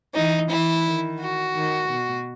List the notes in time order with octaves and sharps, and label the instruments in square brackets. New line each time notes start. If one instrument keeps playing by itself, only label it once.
[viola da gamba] E3 [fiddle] D#4
[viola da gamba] E3 [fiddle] E4
[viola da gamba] D#3
[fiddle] F#4
[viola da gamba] D#3
B2